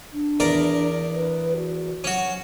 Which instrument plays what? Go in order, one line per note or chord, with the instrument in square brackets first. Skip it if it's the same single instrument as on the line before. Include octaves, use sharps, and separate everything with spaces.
[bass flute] D4
[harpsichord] E2 A#4 D5
[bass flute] B4
F#4
[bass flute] F#3 [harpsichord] C#4 F#4